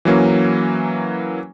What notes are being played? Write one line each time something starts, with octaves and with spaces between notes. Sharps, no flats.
E3 F#3 A#3 C#4